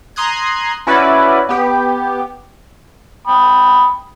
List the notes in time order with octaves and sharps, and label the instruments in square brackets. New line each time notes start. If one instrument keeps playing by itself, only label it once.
[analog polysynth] A#5 C6 D#6 F#6 G#6
C#4 E4 F#4 B4 D5
B3 G4
[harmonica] G5 B5 D#6